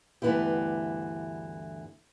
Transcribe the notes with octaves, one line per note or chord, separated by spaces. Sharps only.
D2 G2 E3 B3 E4 G4